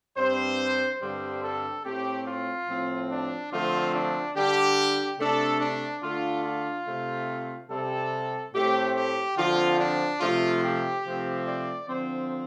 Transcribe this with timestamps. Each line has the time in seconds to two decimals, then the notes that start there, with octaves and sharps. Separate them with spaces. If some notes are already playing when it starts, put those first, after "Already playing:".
0.18 G2 G3 C4 C5
1.01 G2 D3 G3 C4 C5
1.43 A4
1.85 A2 A3 C4 G4
2.26 F4
2.68 A2 F3 C4
3.10 D4
3.52 D3 F3 A3 C4 F4
3.94 D4
4.36 D3 G3 D4 G4
5.19 C3 A3 D4 A4
5.61 D4
6.03 D3 A3 D4 F4
6.45 F4
6.87 C3 A3 C4
7.70 C3 G3 C4 A4
8.54 A2 A3 C4 G4
8.95 G4
9.37 D3 F3 C4 F4
9.79 D4
10.21 C3 F3 A3 F4
10.63 G4
11.04 C3 F3 A3 C4
11.47 D5
11.88 D3 F3 C4 C5